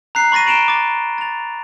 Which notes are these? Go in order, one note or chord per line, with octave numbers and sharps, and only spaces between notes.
A#5 F#6 C7
B5 C#6 A6 A#6 D#7
A#5 B5 D7 E7 F7 G7
D6 A6
A6 F7